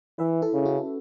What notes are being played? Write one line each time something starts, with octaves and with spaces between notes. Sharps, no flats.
E3 B4 E5
E4 A4
C#3
C#4 F#4